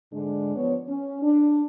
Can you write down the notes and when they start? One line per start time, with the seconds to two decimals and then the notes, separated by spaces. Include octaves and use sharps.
0.11 G#2 D3 G#3 D4
0.55 F3 B3 C#5
0.87 C#4
1.22 D4